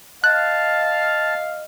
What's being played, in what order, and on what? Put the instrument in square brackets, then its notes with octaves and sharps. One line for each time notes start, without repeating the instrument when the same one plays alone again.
[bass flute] D#5 [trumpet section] F5 [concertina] A5 [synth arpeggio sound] F#6